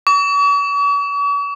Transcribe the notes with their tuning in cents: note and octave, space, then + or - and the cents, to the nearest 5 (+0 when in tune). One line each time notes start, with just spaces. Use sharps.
C#6 +45